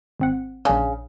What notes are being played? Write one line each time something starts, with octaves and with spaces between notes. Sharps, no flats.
G#1 C4 F#5
A#1 C#3 D4